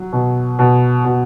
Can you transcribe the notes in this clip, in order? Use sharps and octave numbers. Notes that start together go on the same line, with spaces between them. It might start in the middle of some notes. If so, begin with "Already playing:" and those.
Already playing: F#3
B2
B2
B2